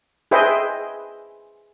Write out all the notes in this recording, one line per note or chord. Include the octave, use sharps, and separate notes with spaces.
G#4 B4 C5 D#5 E5 G5